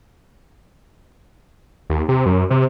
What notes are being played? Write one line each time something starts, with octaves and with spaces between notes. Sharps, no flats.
D#2
C3
F#2
C3